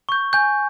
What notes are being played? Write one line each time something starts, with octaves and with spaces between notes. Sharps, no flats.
C#6 G6
G#5 G6